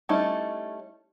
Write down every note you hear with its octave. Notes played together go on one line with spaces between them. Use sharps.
G3 A3 C#4 D#4 E4